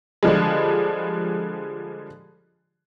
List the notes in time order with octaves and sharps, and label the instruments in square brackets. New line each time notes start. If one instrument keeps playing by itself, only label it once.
[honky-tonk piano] D3 F3 G3 G#3